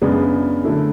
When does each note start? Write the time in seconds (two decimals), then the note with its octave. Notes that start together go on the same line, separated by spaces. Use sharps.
0.02 F#2 C#3 G#3 B3 D4
0.64 D3 F#3 A3 E4